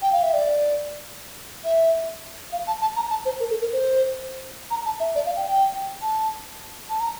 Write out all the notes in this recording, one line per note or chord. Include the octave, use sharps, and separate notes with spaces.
G5
F5
E5
D5
E5
F5
A5
A5
A#5
A5
C5
A#4
A4
A#4
C5
A#5
A5
E5
D5
F5
G5
G5
A5
A5
A#5